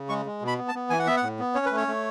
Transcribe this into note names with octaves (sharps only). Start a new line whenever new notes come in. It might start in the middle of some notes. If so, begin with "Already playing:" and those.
Already playing: C#3
G#3 C#6
G#3
B2
B5
B3
A5
B3
E3 G#5
F#5
B3 E5
F#5
A2
B3
C#4 C#5
B4
A3
C#5
A3